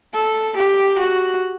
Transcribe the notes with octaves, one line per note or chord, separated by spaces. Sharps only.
A4
G4
F#4